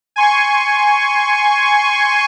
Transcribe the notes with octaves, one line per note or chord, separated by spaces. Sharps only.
G#5 C6 C#6